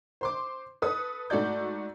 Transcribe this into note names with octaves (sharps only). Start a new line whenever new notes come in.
C5 C6 D6
A4 B4 D#6
G#2 A3 F#4 A4 D5 G6